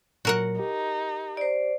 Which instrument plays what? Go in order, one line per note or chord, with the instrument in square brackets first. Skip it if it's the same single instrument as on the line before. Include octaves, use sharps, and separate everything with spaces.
[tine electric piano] A#2 F#3 [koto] F#4 A#4 F#5
[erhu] D#4 [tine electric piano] G4
[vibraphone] C5 D5